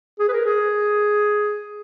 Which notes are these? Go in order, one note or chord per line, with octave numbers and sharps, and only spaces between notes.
G#4
B4
A#4
G#4